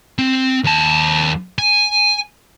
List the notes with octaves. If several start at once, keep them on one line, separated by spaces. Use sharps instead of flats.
C4
D#2 A5
G#5